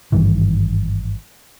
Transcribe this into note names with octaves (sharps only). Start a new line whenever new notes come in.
G#1 G2 D#3 E3